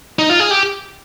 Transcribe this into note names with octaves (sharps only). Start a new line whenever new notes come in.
D#4
F4
G#4
G4